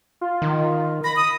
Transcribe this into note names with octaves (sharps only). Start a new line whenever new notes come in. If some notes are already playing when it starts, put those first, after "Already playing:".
F4
D#3
B5 A#6
D#6